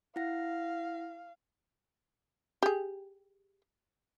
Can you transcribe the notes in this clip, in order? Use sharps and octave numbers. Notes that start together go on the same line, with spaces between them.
E4 F5 F#5 A#6
G4 G#4